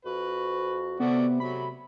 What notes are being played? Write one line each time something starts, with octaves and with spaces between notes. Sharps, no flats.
F2 F#4 B4
C3 A3 B3 F#4 D5
F#3 A3 B5